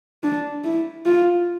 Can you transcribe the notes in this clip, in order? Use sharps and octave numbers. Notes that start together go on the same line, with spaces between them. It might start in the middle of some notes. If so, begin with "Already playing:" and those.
D4
E4
F4